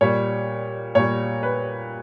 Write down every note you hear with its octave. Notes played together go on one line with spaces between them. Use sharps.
A#2 G3 C#5
A#2 G3 C#5
B4